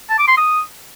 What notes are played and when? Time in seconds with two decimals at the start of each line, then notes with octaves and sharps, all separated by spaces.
0.10 A5
0.19 D6
0.28 C6
0.37 D#6